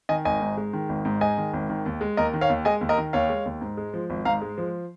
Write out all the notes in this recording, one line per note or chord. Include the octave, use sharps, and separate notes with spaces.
D#3 D#5 G#5
G#1 D#5 G#5
G#2
G#3
D#3
G#1
G#2
G#3 D#5 G#5
D#3
G#1
D#3
D#2
G#3
D#2 A#4 D#5
D#3
C#5 F5
D#2
G#3 D#5 G#5
D#2
A#4 D#5
D#3
D#2 C#5 F5
G#3
D#2
G#2
G#3
F3
G#1
G#2 F5 A#5
G#3
F3